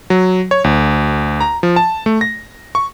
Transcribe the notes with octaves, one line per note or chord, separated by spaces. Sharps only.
F#3
C#5
D2
A#5
F3
A5
A3
A#6
C#6